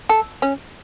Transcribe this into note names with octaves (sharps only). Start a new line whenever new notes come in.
A4
C#4